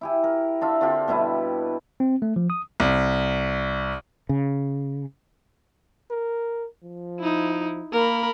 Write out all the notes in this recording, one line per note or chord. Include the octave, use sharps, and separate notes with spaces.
E4 G4 G#5
A#4
D4 F4 E5
D3 C4 F4 G4
B2 G3 E4 B4
C4
A3
F3
D#6
C2
C#3
A#4
F3
D#4 E4
A#3 A#4 B5